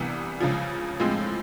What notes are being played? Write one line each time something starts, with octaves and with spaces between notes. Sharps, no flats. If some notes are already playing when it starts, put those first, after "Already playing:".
Already playing: C2 C3 E3 G3 B3
C#2 C#3 F3
A2 F3 G#3 C4